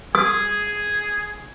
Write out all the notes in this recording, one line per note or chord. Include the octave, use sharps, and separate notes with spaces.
G#4 D#6